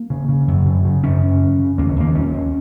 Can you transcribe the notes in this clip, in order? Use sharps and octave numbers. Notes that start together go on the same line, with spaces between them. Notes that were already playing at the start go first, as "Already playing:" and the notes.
Already playing: A#3
C#3
C#3
F#2
C#3
C#3
F#2 C#4
C#3
C#3
C#3
D#2 A#3
C#4
D#2 A#3
D#2 C#4
D#2